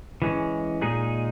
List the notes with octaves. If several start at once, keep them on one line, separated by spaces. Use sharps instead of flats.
E3 G#3 C#4
A#2 G#3 D#4 G#4